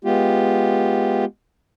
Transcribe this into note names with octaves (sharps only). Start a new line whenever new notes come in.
G#3 B3 F4 G4